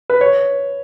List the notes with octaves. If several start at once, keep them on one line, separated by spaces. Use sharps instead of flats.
B4
C#5